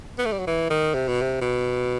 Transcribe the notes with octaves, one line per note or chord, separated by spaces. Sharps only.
B3
A3
G3
F#3
E3
D#3
C3
B2
C3
B2